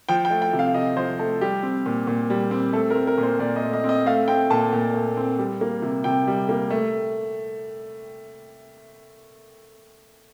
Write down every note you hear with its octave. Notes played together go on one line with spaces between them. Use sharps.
F3 G5
G5
A3
G5
C3
F5
C3 D#5
F3 C5
A3 A4
G3 G4
C4
A#2
A#2
G3
C4
A3 A4
A#4
C4
A#4
A#2
C5
A#2 D5
D#5
A3
D#5
C4
D#5
A3 F5
C4 G5
A#2 A5
A#2
A3
C4
G3
A#3
C3
C3 G5
G3
A#3
A3